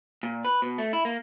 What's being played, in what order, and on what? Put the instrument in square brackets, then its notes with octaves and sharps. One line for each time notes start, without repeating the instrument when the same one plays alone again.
[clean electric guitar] A#2
B4
B2
A3
E4
A#3